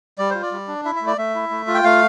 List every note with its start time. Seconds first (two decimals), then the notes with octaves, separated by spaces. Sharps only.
0.18 G3 D5
0.30 F4 C5
0.42 D5
0.52 G3
0.68 D4
0.85 E4 E5
0.96 E5
1.01 A3
1.07 D5
1.18 A3 E5
1.35 E4
1.51 A3
1.68 F4
1.74 G5
1.84 A3 F5